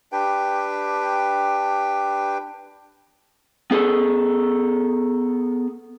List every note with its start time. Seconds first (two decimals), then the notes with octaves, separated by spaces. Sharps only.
0.12 D4 G4 B4 G5
3.71 B3 G#4 A4